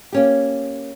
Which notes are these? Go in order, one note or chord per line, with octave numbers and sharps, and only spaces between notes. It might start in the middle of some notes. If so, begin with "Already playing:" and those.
A#3 C#4 G4